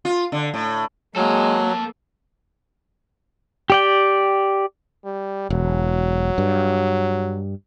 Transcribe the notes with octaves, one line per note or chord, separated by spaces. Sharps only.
F4
D3
A2
F#3 G#3 A#3 A4 F5
G4 D5 G5
G3
E1 F#3
G2